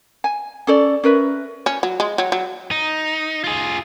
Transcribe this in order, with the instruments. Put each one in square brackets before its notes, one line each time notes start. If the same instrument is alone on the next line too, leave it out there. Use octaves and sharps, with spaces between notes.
[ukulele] G#5
C#4 A4 D5
C#4 A#4 B4 E5
[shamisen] C#4
F#3
G#3
F#3
F#3
[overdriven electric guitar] D#4
F4 G#4